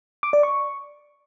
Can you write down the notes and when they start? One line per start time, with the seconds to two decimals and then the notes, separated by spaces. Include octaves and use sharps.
0.23 D6
0.33 D5
0.43 C#6